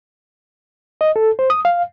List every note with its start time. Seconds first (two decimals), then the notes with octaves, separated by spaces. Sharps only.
1.01 D#5
1.16 A4
1.39 C5
1.50 D#6
1.65 F5